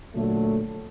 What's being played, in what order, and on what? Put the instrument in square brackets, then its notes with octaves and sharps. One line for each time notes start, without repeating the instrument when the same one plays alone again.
[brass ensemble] A#2 D3 F#3 A3